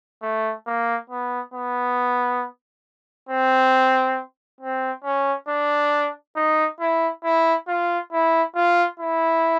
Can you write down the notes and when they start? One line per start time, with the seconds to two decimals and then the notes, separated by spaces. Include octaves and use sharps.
0.22 A3
0.67 A#3
1.10 B3
1.54 B3
3.29 C4
4.61 C4
5.04 C#4
5.49 D4
6.36 D#4
6.80 E4
7.24 E4
7.68 F4
8.12 E4
8.56 F4
9.00 E4